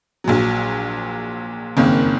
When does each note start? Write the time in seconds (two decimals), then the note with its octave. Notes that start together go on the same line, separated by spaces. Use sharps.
0.24 A#1 A#2 F#3
1.77 F#1 F2 D#3 A#3